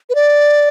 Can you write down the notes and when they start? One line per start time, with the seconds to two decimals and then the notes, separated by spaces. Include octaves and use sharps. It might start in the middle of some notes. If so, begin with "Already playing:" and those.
0.10 B4
0.15 D5